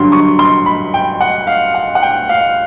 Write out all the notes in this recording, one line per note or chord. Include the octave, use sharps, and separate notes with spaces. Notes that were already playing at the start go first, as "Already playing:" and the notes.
Already playing: G2 D3 F#3 C6
C#6
C6
B5
G5
F#5
F5
F#5
F#5
G5
F5